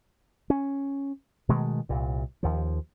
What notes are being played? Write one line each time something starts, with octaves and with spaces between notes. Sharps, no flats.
C#4
B2 D#3 G#3 A3
C2 A#2
D#2 F3